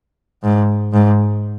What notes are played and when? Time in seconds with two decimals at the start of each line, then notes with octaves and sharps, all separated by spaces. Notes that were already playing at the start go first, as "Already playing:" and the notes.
0.43 G#2
0.93 G#2